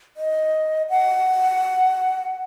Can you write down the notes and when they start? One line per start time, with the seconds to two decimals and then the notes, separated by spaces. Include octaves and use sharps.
0.17 D#5
0.90 F#5